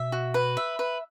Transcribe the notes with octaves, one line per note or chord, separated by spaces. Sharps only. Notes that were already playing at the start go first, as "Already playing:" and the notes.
Already playing: B2 E5
F#4
B4
E5
B4